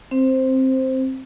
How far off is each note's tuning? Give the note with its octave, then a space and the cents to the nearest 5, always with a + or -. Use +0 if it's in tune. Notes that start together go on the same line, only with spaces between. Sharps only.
C4 +5 C5 +0